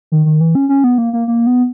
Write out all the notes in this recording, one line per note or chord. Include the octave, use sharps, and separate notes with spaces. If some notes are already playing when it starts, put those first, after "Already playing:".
D#3
D#3
E3
C#4
C#4
B3
A#3
A#3
A#3
B3